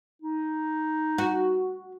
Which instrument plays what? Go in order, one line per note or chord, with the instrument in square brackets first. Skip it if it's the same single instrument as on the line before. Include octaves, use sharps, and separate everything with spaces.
[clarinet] D#4
[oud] F#4